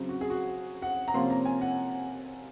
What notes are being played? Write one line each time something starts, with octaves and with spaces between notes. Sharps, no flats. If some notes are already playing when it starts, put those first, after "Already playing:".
Already playing: C#3 F#3 C4
F#4
G#4
F#4
F#5
A#5
C3 F3 A#3 C#4 C6
A#5
G#5
F#5